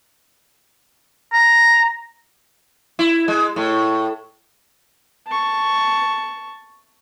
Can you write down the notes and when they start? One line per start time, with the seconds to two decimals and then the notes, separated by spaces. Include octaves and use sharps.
1.33 A#5
2.99 E4
3.28 G#3
3.56 A2
5.27 A5 C#6